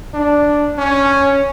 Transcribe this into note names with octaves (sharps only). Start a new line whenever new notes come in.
D4
C#4